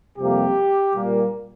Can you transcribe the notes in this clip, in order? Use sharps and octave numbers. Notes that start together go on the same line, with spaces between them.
F2 C3 G3 A#3 G4
A#2 G3 A#3